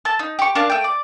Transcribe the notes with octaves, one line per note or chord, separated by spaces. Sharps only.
A4 A5
D#4
G4 C#6
D4 A#4 F5 A5
A3 G5
D5